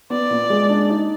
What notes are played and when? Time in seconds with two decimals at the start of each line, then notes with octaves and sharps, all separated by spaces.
0.10 B3 D5
0.30 A#2
0.50 G#3
0.69 D4
0.90 D#4